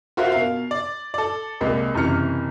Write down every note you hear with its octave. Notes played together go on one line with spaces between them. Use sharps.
F4 F#4 A#4 C5 E5 F5
B2 A#4 F5
D5
A4 D5
C2 G#3 A#3
F#1 C3 E3 F6 C#7